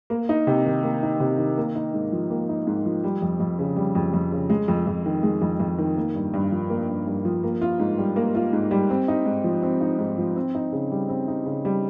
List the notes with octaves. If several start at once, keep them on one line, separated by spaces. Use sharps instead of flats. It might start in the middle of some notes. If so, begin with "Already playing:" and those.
A#3
D#4
C3
D#3
A#3
D#4
C3
D#3
A#3
D#4
G#2
F3
A#3
D#4
G#2
F3
G3
F2
F2
C#3
G3
F2
F2
C#3
G#3
F2
F2
D#3
G#3
F2
F2
D#3
A#3
G2
G2
F3
A#3
G2
G2
F3
A#3
F4
G#2
G3
A#3
F4
G#2
G3
C4
D#4
G#2
F3
C4
D#4
G#2
F3
C4
D#4
C#3
G3
C4
D#4
C#3
G3